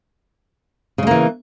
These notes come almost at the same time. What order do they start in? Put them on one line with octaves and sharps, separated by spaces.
C#3 G#3 A#3 E3